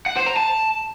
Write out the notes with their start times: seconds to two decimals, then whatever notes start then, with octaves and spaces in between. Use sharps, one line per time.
0.06 F#5
0.16 C5
0.26 A#5
0.37 A5